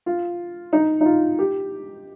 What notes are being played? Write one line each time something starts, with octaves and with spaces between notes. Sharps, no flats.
F4
D#4
D#4
F4
G4